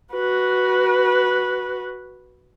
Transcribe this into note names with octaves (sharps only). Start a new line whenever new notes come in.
F#4 B4